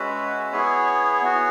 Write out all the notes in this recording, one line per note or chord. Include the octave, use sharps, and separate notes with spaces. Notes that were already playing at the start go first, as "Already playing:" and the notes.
Already playing: G#3 C#4 F#4 B4 E5
B3 E4 G#4 C#5
B3 F#4